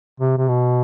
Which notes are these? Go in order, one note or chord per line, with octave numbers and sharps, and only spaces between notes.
C3
C3
B2